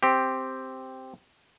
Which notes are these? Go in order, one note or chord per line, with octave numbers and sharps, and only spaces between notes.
C4 G4